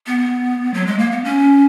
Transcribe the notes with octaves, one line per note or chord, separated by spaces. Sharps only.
B3
F#3
G#3
A#3
B3
C#4